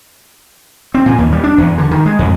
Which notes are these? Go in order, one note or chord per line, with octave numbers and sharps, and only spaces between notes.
C4
A#2
D#2
G3
D4
E2
D3
D#3
G#3
F2